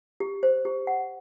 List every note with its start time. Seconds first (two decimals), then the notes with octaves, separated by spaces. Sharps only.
0.20 G4
0.43 C5
0.65 G4
0.87 F#5